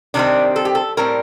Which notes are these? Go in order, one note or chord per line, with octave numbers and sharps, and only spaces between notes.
C3 D#3 G3 C4 D4
A4
G4
A4
A2 G3 C4 A#4